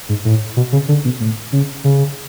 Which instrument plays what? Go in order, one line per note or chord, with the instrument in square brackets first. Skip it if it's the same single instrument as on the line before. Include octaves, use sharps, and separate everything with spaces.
[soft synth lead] G#2
A2
B2
C#3
D3
B2
A2
C#3
C#3